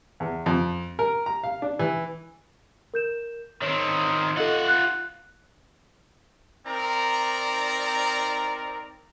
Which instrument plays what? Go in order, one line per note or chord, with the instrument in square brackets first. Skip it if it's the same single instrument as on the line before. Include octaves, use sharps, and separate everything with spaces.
[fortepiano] E2
F2
A#4
A#5
F5
D4
E3
[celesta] A#4 G6 E7
[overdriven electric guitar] D#3 C4 [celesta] C#5
[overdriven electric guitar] F4 F#5 [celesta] A4 D#5
[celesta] F#6
[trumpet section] C4 D#4 A#4 D5 A#5